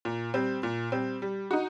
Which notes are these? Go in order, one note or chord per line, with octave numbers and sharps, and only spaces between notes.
A#2
G3 C4
A#2
G3 C4
G3
D#4 F#4